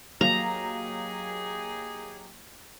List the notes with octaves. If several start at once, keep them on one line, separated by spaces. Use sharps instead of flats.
F#3 A#3 D#4 G4 G#4 A#5